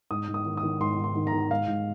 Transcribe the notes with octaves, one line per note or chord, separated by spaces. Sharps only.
G#2 D#6
G#2
D#6
D#3
D#6
D#3
G#2 C6
G#2
C6
D#3
A#5
D#3
G#2 F5
G#2